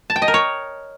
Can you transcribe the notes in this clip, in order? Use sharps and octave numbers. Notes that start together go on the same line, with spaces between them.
A5
G5
D#5
A#4
C#5